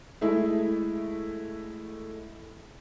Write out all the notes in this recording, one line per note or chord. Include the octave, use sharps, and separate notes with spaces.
G#3 A3 E4 G#4 E5